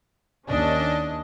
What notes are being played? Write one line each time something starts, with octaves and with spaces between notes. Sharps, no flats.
D#2 C#4 D4 D#5